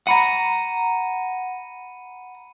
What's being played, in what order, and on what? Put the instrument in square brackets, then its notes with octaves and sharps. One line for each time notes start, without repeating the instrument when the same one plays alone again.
[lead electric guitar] F#5 A#5 [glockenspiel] B5 C#7 D#7